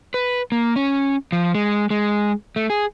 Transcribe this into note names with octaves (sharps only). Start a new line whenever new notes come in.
B4
A#3
C#4
F3
G#3
G#3
A3
G#4